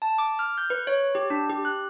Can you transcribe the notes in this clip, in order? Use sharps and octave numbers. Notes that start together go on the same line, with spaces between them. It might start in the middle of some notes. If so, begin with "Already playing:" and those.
A5
D6
F6
G6
B4
C#5
G4
D4
G4
F#6